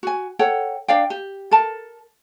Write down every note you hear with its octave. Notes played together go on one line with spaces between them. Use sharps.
F#4 G#5
A4 C#5 F#5 G5
D4 D5 F5 G5
G4
A4 A#4 A5